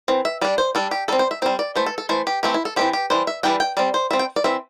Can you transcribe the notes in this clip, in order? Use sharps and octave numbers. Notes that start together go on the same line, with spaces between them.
E3 C4
E5
G3 D4 D5
C5
G3 D4 A4
G4
G3 C4 A4
C5
E5
G3 C4 C5
D5
E3 A3 C5
A4
A4
E3 A3 C5
G4
E3 A3 C4 G4
E4
A4
E3 A3 C4 G4
G4
E3 G3 D4 C5
E5
E3 G3 D4 G5
G5
G3 C4 D5
C5
G3 C4 E5
G5
D5
E3 C4 E5